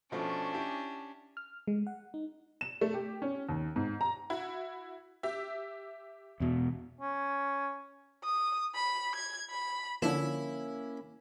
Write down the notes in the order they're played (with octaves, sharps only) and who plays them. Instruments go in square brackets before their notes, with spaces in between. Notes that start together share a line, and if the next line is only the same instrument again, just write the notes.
[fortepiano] B2 F3 A3 [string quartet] C#4 D4
[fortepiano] E4 G4
[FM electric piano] F6
G#3
F#5
D#4
[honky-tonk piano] E7
A3
G4
C#4
D#2
G#2
A#5
E4 F#4
G4 E5
[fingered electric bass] E2 B2
[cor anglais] C#4
[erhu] D#6
B5
G#6
B5
[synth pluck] D3 F3 [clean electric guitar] A#3 C#4 [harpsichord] E4